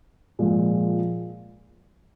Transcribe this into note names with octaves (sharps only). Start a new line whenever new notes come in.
A#2 F3 G#3